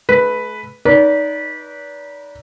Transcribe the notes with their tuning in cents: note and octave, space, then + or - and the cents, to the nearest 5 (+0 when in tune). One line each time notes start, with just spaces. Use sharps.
A3 -45 B4 +0
D#4 +0 B4 -20 D5 -35